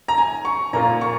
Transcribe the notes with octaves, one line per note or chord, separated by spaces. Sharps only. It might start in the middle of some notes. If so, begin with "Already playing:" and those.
A#5
G#5
C#6
A#2 A#3 F4 A#5
C#6